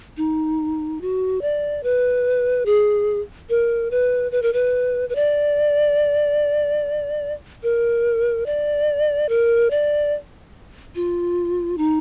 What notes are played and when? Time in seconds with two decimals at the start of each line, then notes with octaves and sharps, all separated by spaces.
0.17 D#4
1.01 F#4
1.41 D5
1.83 B4
2.66 G#4
3.49 A#4
3.91 B4
4.32 B4
4.42 A#4
4.53 B4
5.09 B4
5.15 D5
7.63 A#4
8.46 D5
9.29 A#4
9.71 D5
10.95 F4
11.78 D#4